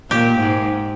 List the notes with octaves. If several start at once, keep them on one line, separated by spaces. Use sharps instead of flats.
A#2 G4
G#2